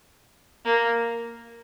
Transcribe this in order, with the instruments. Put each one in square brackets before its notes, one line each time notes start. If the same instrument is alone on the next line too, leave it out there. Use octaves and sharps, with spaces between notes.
[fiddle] A#3